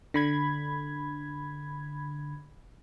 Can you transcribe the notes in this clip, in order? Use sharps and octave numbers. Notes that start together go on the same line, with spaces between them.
D3 B5 G#6